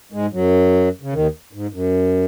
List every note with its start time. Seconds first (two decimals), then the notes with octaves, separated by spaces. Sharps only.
0.12 G#2 G#3
0.32 F#2 F#3
1.02 C#3
1.13 D#2 D#3
1.53 G#2
1.73 F#2